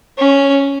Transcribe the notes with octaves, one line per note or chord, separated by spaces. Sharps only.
C#4